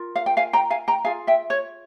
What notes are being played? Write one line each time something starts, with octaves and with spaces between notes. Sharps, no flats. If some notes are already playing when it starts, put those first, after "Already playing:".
Already playing: F4 A#4
F5
G5
F5 G#5
G5 A#5
F5 G#5
G5 A#5
F4 G#4 F5 G#5
E5 G5
C#5